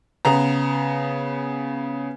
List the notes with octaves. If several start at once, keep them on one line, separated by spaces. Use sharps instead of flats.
C#3 B3 A#5